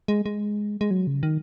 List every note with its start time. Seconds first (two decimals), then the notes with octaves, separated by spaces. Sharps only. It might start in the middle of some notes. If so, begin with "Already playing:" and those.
0.08 G#3
0.26 G#3
0.81 G#3
0.91 F#3
1.07 C#3
1.23 D#3